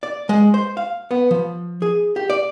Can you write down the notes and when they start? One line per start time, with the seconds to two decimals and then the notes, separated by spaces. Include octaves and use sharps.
0.03 D5
0.29 G#3
0.54 C5
0.77 F5
1.11 B3
1.31 F3
1.82 G#4
2.16 G4
2.30 D5